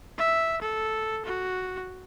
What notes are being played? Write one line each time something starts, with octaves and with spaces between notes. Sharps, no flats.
E5
A4
F#4